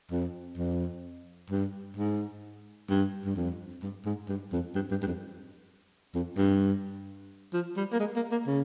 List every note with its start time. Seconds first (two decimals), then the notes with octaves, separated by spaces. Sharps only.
0.11 F2
0.58 F2
1.50 G2
1.97 G#2
2.89 G2
3.26 G2
3.36 F2
3.82 G2
4.05 G#2
4.29 G2
4.52 F2
4.75 G2
4.91 G2
5.02 G2
5.07 F2
6.15 F2
6.38 G2
7.53 F3
7.77 G3
7.92 A#3
8.00 G#3
8.16 A#3
8.31 A#3
8.47 C#3